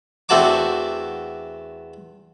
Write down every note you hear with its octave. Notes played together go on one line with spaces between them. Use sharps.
E2 A3 C4 F#4 A5 D6